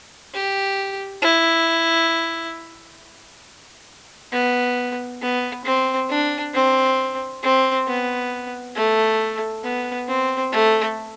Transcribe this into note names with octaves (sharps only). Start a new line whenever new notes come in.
G4
E4
B3
B3
C4
D4
C4
C4
B3
A3
B3
C4
A3